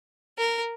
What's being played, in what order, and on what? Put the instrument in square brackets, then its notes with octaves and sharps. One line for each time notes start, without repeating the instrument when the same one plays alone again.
[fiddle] A#4